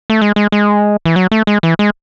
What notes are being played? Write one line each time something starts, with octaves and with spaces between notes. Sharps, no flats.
A3
G#3
G#3
G#3
E3
F#3
A3
G#3
E3
G#3